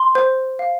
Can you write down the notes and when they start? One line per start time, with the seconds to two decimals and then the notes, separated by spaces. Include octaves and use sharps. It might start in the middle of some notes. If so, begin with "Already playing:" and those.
Already playing: C6
0.15 C5
0.59 F5